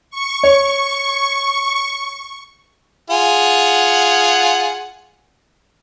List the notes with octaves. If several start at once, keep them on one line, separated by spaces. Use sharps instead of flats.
C#6
C#5
F4 G#4 F#5